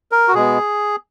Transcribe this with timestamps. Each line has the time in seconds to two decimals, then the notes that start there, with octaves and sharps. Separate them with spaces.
0.12 A#4
0.28 F#4
0.34 B2 G#3 B3 G#4